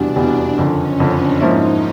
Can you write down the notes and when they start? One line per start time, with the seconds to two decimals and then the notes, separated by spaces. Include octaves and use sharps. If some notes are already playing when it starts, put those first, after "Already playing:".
Already playing: F1 E2 B2 G3 D4
0.16 F1 E2 B2 G3
0.57 F#1 F2 D3 C#4
0.99 F#1 F2 D3 D4
1.40 G#2 F3 A#3 C#4 D#4 E4